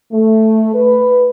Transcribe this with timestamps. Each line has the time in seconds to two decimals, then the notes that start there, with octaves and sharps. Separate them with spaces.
0.12 A3
0.74 B4